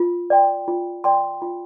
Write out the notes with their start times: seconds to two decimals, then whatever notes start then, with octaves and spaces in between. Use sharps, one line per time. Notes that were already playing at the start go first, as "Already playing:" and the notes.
Already playing: F4
0.30 D5 G5 C6
0.68 F4
1.04 D5 G5 C6
1.42 F4